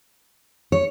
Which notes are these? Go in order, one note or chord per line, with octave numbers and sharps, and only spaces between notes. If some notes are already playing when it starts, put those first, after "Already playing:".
C#5